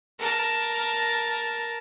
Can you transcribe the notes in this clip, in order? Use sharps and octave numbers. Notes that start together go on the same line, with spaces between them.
A#4 A5